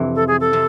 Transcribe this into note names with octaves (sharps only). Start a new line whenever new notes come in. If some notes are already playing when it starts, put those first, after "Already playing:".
Already playing: F2 C3 E3
A4
G#4
A4
C3